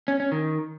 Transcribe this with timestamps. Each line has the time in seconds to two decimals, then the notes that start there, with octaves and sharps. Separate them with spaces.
0.08 C#4
0.20 C#4
0.32 D#3